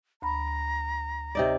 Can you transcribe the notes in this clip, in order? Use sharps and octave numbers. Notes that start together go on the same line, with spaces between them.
D2 A#5 B5
C3 D#4 D5